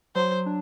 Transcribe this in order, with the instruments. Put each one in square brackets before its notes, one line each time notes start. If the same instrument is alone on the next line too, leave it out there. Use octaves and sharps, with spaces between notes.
[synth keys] F#3 [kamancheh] C5
[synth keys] D4